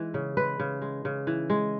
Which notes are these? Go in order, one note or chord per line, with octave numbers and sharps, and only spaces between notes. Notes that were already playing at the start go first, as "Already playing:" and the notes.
Already playing: E3 G#3
C#3
G#3 B4
C#3
G#3
C#3
E3
G#3